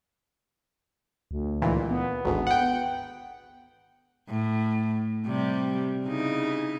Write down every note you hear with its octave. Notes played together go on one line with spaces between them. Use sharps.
D2
C#2 A#2 E3
B3
G#1 D2 G#2
F#5 G5
A2
C3 G3
C#3 D#4 E4